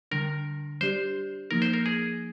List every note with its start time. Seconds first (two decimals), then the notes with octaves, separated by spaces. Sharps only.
0.11 D3 G3 D4 A#4
0.81 G3 D4 G4 C5 D5
1.51 F3 A#3 D#4 A#4
1.62 C5
1.73 A#4
1.86 G#4